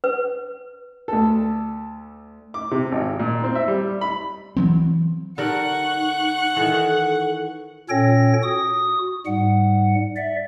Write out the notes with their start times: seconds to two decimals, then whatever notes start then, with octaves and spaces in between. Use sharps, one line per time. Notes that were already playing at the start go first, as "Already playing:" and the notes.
0.04 B4
1.08 D2 A4
2.54 D6
2.71 C3
2.92 G#1
3.19 A#2
3.44 C4
3.55 E5
3.68 G3
4.01 B5
4.57 E3 F#3 C4
5.38 D3 D#4 G4 A#4 F#5 C#6 F#6
6.56 D#3 E3 A4
7.89 A#2 C#4 A4 C#5 G5 A#6
8.43 F#4 D#6
9.26 G#2 G3 F#5
10.16 D5 E5